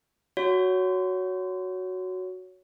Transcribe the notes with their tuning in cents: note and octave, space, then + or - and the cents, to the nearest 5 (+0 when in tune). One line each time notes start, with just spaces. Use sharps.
F#4 +0 C#5 +15